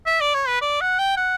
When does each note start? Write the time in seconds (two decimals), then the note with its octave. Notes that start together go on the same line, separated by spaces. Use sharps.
0.06 E5
0.21 D5
0.34 C#5
0.48 B4
0.61 D5
0.81 F#5
0.99 G5
1.17 F#5